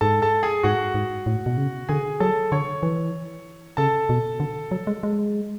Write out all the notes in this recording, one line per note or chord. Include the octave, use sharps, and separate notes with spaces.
G#2 A4 A5
A4 A5
G#4 G#5
G#2 F#4 F#5
G#2
A2
B2
C#3
D3 G#4 G#5
F#3 A4 A5
D3 C#5 C#6
E3
C#3 A4 A5
B2
D3
F#3
G#3
G#3